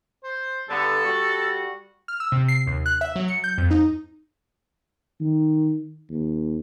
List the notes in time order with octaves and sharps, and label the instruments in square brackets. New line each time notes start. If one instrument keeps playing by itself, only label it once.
[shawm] C5
[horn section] G2 D3 B3 [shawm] A4
[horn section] G3 F#4
[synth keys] F6
E6
C3
C7
D#2
F#6
E5
F#3
C#7
G6
F2
D#4
[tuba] D#3
D#2